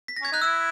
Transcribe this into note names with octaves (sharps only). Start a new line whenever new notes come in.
B6
A#6
C#4 G#6
D#4 F#6
E4 E6